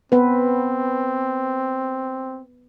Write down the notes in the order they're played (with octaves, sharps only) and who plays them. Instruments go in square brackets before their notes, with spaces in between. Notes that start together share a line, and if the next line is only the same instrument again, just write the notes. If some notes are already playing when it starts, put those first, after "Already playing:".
[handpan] B3 B4 [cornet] C4